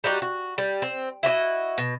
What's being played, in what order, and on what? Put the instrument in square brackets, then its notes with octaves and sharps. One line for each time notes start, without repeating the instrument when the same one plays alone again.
[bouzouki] G3 D#4 F#4 G4
F#4
G3
C4
E4 F#4 C#5 D#5
B2